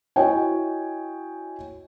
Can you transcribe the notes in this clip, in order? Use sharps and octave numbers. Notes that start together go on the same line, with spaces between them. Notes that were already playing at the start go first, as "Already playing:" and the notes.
E4 F#4 C#5 D#5 G5 G#5